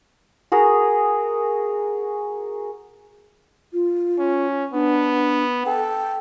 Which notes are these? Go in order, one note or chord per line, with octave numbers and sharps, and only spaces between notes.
F#4 G#4 A#4
F4
C#4
B3 D4
A4 G5